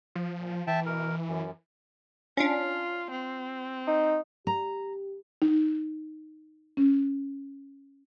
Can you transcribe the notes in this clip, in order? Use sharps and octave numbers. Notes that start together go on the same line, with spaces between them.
F3
A#2
E3 E5 G5 A5
B2 A#4
F#2
C#4 D4 F4
C4
D#4
G4 A#5
D#4
C#4